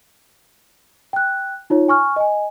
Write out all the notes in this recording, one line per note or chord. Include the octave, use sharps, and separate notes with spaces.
G5 F#6
D#4 F4 C#5
G#5 C#6 F6
D#5 G#5